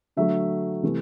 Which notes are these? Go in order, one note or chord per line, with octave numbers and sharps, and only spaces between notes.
D3 F#3 A3 E5
C3 E3 A3